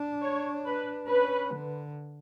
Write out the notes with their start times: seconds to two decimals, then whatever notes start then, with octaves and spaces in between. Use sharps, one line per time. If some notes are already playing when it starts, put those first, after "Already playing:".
Already playing: D4
0.22 C#5
0.67 B4
1.09 C#4 B4
1.52 D3